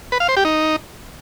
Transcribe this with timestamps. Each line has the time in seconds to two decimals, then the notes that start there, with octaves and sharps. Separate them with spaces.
0.12 B4
0.20 F5
0.28 C5
0.37 G4
0.45 D#4